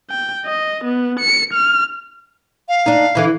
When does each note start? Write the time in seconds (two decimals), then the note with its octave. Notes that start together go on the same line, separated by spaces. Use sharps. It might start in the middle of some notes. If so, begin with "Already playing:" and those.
0.10 G5
0.46 D#5
0.85 B3
1.20 C#7
1.53 F6
2.69 F5
2.86 D4 D#4
3.15 D3 E3 E4